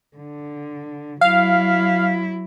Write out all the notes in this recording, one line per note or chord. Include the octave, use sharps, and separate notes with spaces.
D3
F#3 E4 F5